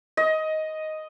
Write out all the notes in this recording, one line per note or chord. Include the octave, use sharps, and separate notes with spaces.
D#5